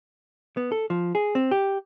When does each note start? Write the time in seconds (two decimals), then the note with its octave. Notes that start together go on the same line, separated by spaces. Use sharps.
0.57 B3
0.72 A4
0.90 F3
1.15 G#4
1.35 C4
1.51 G4